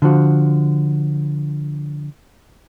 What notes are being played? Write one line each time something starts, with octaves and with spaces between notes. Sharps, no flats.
D3 F3 F#4